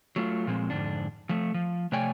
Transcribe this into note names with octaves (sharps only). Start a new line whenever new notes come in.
F#3 A3 F4
A#2 F3 G#3 C4
F2 G#2 D3 D4
F3 A3
F3
C3 A3 C#5 D5 G5 G#5